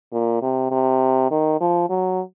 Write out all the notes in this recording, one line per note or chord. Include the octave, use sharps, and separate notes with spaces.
A#2
C3
C3
D#3
F3
F#3